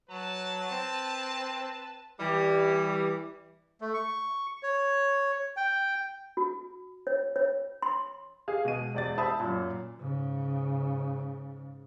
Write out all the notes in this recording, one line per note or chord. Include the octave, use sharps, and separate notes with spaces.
F#3 B4 A5
C4
E3 G3
A3
C#6
C#5
G5
F#4
C#5
C#5
C6
G#4 F5
B2 G#3 D#7
E1 D5 A6
C5 E5 A5 B5 D#6
F#2 A#2
G#2 C#3